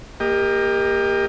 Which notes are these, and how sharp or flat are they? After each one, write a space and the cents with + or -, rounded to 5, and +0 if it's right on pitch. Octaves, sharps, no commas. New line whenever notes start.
A#3 +0 G4 +25 D#5 +0